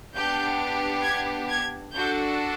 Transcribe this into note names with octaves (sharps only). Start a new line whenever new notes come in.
B3 D4 G4 G6
G#6
G#6
D4 F#4 A4 G6